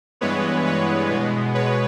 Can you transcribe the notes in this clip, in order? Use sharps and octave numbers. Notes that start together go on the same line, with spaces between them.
G2 E3 G#3 B3 B4 C#5
B4 C#5
B2 G#3 B3
B4 C#5